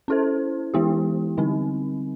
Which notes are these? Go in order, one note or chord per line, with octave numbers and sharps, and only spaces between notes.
C#4 E4 A4 C5
E3 G#3 B3 E4 G4
D3 G3 C4 D#4